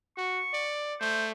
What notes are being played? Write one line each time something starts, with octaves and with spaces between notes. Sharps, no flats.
F#4 C#6
D5
A3 C5